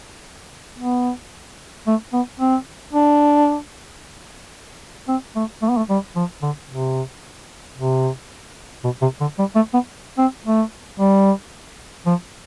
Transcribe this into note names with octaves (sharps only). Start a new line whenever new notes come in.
B3
A3
B3
C4
D4
C4
A3
A3
B3
A3
G3
F3
D3
C3
C3
B2
C3
D3
G3
A3
B3
C4
A3
G3
F3